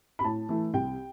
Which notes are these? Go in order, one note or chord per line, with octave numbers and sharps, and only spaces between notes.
B5
A2 A5
E3 A3
C2 G5